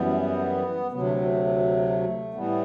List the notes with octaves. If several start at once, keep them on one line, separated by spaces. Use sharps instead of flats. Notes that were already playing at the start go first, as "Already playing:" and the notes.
Already playing: F#2 E3 G3 B3
D2 C3 F#3 B3
A3
A3
A2 E3 G3 B3